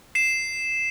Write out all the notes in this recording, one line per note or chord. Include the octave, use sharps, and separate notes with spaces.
C7 E7